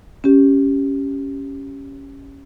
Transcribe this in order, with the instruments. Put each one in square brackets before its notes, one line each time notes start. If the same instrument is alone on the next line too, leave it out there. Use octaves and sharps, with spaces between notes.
[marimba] C#4 G4